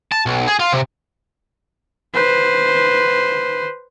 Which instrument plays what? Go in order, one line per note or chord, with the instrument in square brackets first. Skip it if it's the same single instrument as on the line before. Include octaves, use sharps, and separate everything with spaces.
[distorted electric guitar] A5
B1
G#4
F4
C3
[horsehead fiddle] B4 C5